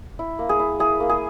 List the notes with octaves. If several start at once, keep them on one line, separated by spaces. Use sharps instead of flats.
E4
A#3
G#4
E4
E4 G#4
A#3
G#4